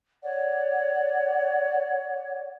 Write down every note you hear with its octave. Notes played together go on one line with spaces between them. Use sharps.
C#5 D5 F#5